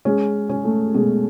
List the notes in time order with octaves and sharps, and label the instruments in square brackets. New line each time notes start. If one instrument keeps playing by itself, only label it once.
[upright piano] G#3 [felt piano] C#4
[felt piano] C#4
[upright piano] A3
[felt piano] B2 [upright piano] G#3